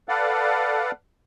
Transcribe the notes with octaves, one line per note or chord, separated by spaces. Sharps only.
A4 B4 D5 F5 F#5